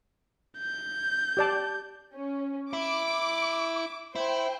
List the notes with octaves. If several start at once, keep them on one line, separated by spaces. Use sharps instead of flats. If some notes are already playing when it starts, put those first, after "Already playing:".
G6
G4 D5 A5
C#4
E4 D6
E4 C5 G5